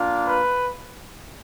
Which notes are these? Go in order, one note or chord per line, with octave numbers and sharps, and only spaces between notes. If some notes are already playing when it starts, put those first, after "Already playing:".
Already playing: A#3 D4 F4
B4